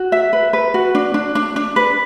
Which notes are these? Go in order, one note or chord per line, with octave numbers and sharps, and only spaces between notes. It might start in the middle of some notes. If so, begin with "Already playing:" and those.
Already playing: F#4
E5
B4
B4
F#4
D4
D4
D4
D4
B4